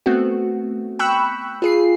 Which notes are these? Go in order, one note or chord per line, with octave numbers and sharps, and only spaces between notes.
A3 B3 C4 F#4
G5 B5 C#6 E6 F#6
F4 G#4 C7